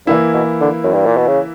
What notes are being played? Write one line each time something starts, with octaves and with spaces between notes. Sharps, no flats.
G2 E3 A#3 E4
B2
D3
F#2
G2
A#2
B2
C#3